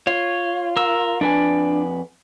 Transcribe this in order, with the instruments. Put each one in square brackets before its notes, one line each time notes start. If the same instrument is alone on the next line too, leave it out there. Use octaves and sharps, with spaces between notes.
[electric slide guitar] F4 [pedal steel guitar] C#5
[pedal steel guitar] A#4 E6
[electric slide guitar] F2 B4 G#5 [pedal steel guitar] D4